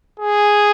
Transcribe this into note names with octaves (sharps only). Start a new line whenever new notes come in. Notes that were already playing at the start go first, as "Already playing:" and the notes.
G#4